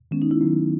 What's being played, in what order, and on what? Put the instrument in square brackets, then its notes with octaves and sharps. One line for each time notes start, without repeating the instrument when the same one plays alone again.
[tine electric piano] D#3 G#3 B3 [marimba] C#4
[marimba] D#4
E4
[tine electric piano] D#3 F#3 B3 D#4